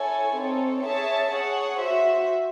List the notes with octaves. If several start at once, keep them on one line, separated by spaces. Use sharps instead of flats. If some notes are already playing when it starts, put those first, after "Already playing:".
Already playing: E4 A4 C#5 G#5
C4 D#4 A4 C#5
G#4 C#5 E5 A5
G#4 C#5 F#5
F#4 C5 E5